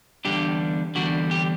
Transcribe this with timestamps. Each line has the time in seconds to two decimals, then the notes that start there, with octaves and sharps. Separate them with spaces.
0.25 E2 D3 G3 D4 G4
0.95 E2 D3 G3 D4 F#4
1.31 G4